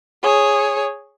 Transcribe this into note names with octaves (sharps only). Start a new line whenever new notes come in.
G#4 C#5